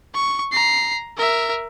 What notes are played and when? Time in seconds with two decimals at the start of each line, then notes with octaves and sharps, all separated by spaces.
0.14 C#6
0.52 A#5 C7
1.17 A#4 E5